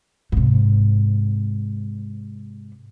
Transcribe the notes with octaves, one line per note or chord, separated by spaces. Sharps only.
G#2 C3